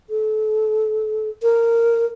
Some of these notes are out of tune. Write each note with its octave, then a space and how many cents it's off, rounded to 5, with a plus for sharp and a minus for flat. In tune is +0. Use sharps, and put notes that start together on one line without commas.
A4 -30
A#4 -10